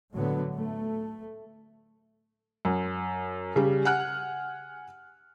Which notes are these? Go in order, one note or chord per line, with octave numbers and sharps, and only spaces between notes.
A2 D3 F#3 B3
A3
F#2
C#3 G3
F#5 G#5 F6 F#6